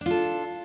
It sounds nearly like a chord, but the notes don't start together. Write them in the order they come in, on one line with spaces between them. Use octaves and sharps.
D4 F4 A4